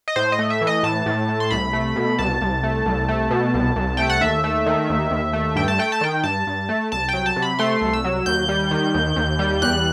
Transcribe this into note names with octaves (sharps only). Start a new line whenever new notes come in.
D#5
A2 C5
D#5
A3
E5
E3
D#5
A2 A5
A2
A3
C6
C2 B5
A3
B2
C2 A5
C2
A3
C2
A3
B2
C2
C2
A3 G5
F#5
D#2 E5
A3
D#3
D#2
D#2
A3
G2 G5
A5
A3 G5
A5
D#3 G5
G2 A5
G2
A3
C2 A5
F#3 G5
A5
C3
B5
A3 C6
C2
E6
F#3
D#2 G6
G3
D#3
D#2
D#2
G3
E2 F#6